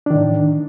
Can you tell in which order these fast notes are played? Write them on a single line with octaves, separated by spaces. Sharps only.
D4 D#3 A2